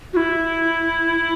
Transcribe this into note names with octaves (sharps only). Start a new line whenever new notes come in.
F#4
E4